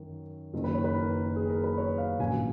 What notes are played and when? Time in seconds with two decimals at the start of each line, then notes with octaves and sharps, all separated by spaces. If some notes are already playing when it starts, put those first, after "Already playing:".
Already playing: F#2 D#3 D#4
0.53 F#1 F#2 D#3
0.64 B4
0.74 C#5
0.84 B4
0.94 A#4
1.36 G#4
1.50 A#4
1.64 B4
1.77 C#5
1.98 F5
2.19 A#1 G#2 D#3 F#3 C#4 G#5